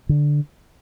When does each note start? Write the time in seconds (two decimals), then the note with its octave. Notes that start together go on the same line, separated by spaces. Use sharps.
0.09 D3